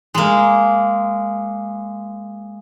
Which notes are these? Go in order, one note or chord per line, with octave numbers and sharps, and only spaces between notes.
G#3 A#3